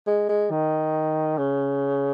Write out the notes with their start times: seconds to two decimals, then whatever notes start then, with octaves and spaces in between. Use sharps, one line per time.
0.07 G#3
0.29 G#3
0.51 D#3
1.38 C#3